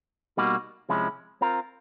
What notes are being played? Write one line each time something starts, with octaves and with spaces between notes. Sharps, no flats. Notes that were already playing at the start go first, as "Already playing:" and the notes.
B2 G3 A#3 D#4 F#4
C3 F3 G#3 C#4 E4
C4 F4 A#4